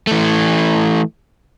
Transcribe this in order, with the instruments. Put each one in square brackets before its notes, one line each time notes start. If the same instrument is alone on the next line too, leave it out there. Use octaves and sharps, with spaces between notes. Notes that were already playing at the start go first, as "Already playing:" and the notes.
[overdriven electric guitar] E3 A3